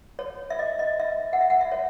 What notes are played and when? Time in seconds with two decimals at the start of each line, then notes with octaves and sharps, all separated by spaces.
0.19 C#5
0.50 E5
0.59 D#5
0.79 D#5
1.00 E5
1.33 F#5
1.41 E5
1.50 F#5
1.61 E5
1.72 C#5